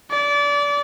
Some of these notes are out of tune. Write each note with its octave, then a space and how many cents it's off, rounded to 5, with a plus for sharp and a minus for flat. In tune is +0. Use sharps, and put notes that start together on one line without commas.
D5 -25